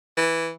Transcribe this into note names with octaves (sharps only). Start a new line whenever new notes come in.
E3